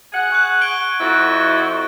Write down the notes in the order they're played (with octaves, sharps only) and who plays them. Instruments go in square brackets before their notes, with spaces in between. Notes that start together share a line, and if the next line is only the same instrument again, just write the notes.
[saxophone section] G#4 F#5
[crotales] C#6 F#6
C#6 D7 G7
[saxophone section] F2 E4 F#4